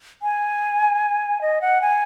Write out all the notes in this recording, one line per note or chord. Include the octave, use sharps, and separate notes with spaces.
G#5
D#5
F#5
G#5